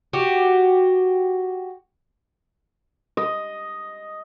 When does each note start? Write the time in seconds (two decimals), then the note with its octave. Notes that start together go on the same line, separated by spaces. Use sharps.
0.13 F#4 G4
3.17 D#5